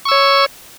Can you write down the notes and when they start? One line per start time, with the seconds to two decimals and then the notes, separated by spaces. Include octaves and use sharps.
0.05 C#6
0.08 E6
0.12 C#5